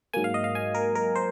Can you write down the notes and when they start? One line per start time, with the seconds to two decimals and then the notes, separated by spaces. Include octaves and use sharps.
0.13 G#2 F#3 A#3 G#5
0.24 F5
0.34 D#5
0.44 F5
0.55 G#5
0.75 A#4
0.95 A#4
1.15 C5